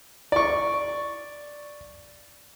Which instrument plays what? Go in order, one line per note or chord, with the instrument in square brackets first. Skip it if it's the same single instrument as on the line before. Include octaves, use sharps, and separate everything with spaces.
[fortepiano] D5 C#6